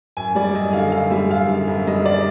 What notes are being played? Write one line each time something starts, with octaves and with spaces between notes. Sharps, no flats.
F#2 G#5
G3 D5
F#2 D#5
D3 F5
F#2 F5
G3 E5
F#2 F5
D3
F#2
G3 D#5
D5